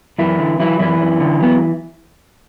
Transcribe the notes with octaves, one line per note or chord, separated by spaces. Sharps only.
F#2 E3 E4
D3
E3 F#3 E4
F#2 E3 E4
F#2
D3
F#3 B3